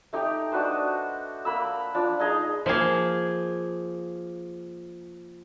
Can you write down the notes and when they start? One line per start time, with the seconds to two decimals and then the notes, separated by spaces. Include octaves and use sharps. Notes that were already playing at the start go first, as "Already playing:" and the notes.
0.13 A3 D#4 G4
0.52 D4 F#4 B4 C5
1.45 A#3 B5 E6
1.94 F3 D4
2.19 D#4 G#4 D#5 A#5
2.66 F3 A#3 G#4